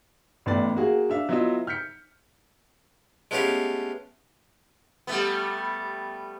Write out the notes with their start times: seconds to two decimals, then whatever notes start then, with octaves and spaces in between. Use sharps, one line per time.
0.46 A1 A2 B3 D5 A6
0.75 A#3 F#4 G#4 F5
1.10 D4 E5 F5
1.29 F#3 B3 E4 F4 D#5 E5
1.67 F6 G6 B6 C#7
3.31 G#3 A3 B3 C#4 G4 F5
5.07 G3 A3 B3